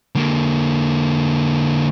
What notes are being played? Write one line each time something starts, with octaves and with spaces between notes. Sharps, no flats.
D3 A#3